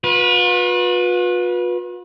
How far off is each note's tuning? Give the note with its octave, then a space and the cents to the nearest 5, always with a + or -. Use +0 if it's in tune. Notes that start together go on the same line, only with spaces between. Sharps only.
F4 +45 B4 -15